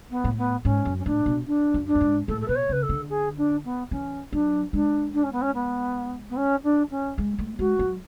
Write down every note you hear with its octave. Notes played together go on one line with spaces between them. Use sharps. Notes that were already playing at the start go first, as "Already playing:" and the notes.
B3
A2
B3
G#2 C#4
F#2
C#4
A2 D4
B2
D4
F#2
D4
F#2
G#2
A2 A4
A4
B2 B4
C#5
C#3 B4
A4
D3
G#4
D4
B3
E3 C#4
F#3 D4
G#3 D4
D4
C#4
B3
C#4
B3
B3
C#4
D4
C#4
G#3
A3
G#3 F#4
F#3